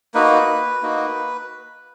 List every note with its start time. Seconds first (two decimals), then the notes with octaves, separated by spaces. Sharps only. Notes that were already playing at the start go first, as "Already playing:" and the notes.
0.14 A#3 D#4 F#4 B4
0.82 A#3 D#4 F#4